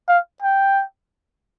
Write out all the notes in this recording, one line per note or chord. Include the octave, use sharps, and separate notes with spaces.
F5
G5